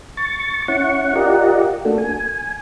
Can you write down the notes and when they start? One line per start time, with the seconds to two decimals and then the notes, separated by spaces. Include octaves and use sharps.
0.17 C#6 A6
0.68 C#4 E4 F#5 C#6
1.15 F4 G4 A#4 D5 D#5 F#5
1.85 A3 A#3 D4 F#4 A4
1.98 G#5